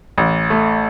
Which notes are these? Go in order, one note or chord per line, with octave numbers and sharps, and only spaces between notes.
A1
A3